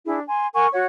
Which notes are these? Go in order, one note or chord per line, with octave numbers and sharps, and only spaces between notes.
D4 E4 G#4
G#5 C6
A#4 F#5 G#5 C#6
F#4 C#5 F#5